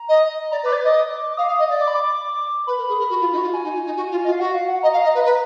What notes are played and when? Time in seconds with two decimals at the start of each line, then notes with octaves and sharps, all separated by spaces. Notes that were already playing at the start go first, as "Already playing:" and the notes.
Already playing: A#5
0.09 D#5
0.51 D5 A#5
0.63 B4 D6
0.73 D5
0.80 D#5 D6
0.94 D6
1.33 D6
1.37 F5 D#6
1.48 F5
1.59 D#5
1.70 D5
1.81 D6
1.88 B5
1.95 D6
2.67 B4 B5
2.78 A#4
2.89 G#4
2.99 A#4
3.10 F#4
3.20 F4
3.32 D#4
3.37 F#4
3.42 F4
3.53 F#4 G#5
3.64 D#4
3.75 F4
3.85 D#4
3.96 F#4
4.11 F4
4.25 F4 D#5
4.32 F5
4.39 F#4 F#5
4.54 F5
4.68 F#5
4.83 D#5 A#5
4.93 F5
5.04 D#5
5.15 B4
5.25 B4